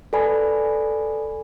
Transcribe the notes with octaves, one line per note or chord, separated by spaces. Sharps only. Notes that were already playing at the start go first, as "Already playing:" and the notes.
A4 B4 D5 G#5 B5